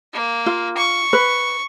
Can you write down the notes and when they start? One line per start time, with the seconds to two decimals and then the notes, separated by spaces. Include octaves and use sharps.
0.14 A#3
0.46 F4
0.77 C#6
1.13 B4